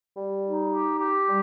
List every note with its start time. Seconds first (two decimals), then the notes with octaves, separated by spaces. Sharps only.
0.16 G3
0.44 D#4
0.71 G4
0.98 G4
1.27 G3